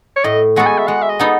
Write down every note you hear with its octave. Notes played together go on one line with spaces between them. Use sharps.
C#5
A2 D#5
G#3 B3 F#4 A4 F#5
G#5
E5
G#3 F#5
E5
D#5
B3 D#4 A4 B4